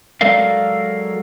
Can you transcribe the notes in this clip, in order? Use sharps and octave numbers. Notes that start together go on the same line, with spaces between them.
F#3 G#3 A4 A#4 D5 F5